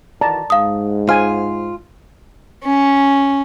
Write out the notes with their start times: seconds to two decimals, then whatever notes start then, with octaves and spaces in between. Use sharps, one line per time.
0.21 D#3 E3 F#4 D5 A5 A#5
0.50 G#2 F5 D#6
1.09 F4 C5 G#5 F6
2.64 C#4